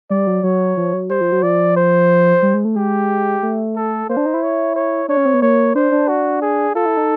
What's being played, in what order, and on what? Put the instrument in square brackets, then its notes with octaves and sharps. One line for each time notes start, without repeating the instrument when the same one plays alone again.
[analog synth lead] G3 [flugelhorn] D5
[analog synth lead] F#3
[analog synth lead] F#3 [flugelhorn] C#5
[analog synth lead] F3
F#3
[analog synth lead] G3 [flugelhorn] C5
[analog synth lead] F3
F#3
[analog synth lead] F3 [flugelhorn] D5
[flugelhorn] C5
[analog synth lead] G3
G#3
A3
[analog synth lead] G#3 [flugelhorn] G4
[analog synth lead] A3
[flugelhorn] A4
[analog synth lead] A#3 [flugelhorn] C5
[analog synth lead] D4
D#4
E4
[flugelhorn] C#5
C#5
[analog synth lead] D4 [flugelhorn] C#5
[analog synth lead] C#4
C4
B3
[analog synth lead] A#3 [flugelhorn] C#5
[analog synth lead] D4 [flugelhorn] C5
[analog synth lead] D4
[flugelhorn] F#4
G#4
[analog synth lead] F4 [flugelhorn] A4
[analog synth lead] E4
D#4